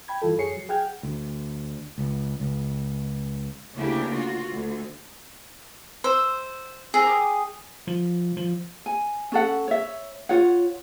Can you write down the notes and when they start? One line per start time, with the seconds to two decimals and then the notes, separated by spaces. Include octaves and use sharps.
0.08 G5 B5 G#6
0.22 G2 E3 F4 A4
0.38 F#2 F#3 G#4 C#5 C7 C#7
0.57 F#3
0.69 G#4 F#5 G5 F6 G#6
1.03 D2
1.98 C#2
2.40 C#2
3.75 D2 C#3 A#3 D4 E4 G4
4.13 F4 F#4
4.53 D2
6.04 C5 E6
6.94 C4 F#4 G#4 A#4
7.07 G4 D6 D#6
7.87 F3
8.37 F3
8.86 G#5
9.32 C#4 A4 F#5
9.68 C#5 E5
10.29 F4 C#5 F#5